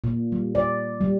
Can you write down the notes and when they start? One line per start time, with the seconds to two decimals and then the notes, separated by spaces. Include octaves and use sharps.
0.04 A#2
0.32 G3
0.55 D5
1.01 G3